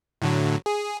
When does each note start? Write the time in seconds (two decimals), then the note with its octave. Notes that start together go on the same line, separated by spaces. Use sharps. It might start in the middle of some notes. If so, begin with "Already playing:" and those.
0.22 A2 D3 F#3
0.66 G#4